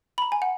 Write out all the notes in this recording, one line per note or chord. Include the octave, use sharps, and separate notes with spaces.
B5
A#5
G#5
F#5